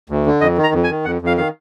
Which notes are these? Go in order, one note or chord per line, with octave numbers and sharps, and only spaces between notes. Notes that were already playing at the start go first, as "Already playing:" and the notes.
D2
D3
F2 D#5
D#3
A#5
F2
G#5
D#3
F2 F#5
F2 F5
D#3 F5